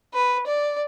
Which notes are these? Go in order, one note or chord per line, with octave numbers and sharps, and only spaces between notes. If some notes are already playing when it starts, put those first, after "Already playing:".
B4
D5